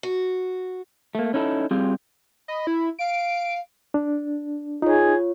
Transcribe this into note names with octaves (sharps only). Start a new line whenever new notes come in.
F#4
A3 A#3
C#4 D#4 E4 A4
G3 C4 F4 G4 G#4
D#5 B5
E4
F5 D7
D4
D#4 F4 G#4 C#5